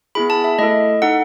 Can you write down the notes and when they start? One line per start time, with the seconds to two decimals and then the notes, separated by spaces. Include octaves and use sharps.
0.15 B3 E4 G#4 B5
0.30 A5
0.44 E5
0.59 A3 E4 A4 D#5
1.02 D#4 A4 F#5